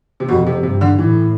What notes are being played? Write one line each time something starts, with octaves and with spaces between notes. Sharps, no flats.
C3
F2 B2
C3
G2 C3
D3
A2 E3